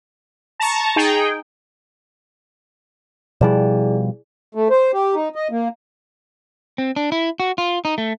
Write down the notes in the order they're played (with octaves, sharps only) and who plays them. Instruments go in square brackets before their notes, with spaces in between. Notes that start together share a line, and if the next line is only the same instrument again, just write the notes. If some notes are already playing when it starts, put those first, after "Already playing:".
[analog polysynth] A5 A#5 C#6
D#4 G#4 G5
[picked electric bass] B2 F3 G3 [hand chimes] E4 G#4 D5
[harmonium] A3
C5
G4
D#4
D#5
A#3
[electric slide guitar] C4
D4
E4
F#4
F4
D#4
A3